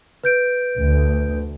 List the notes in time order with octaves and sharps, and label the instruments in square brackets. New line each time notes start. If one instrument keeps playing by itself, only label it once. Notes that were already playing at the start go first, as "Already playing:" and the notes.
[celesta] B4 G6 D7
[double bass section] D2